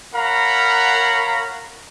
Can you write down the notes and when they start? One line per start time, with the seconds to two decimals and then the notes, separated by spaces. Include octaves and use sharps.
0.14 A#4 C#5 F5 F#5 A#5 B5